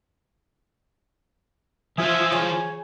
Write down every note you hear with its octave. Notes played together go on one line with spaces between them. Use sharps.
E3 F4 C5 E5 G#5 D#6
C#3 C#5 G#5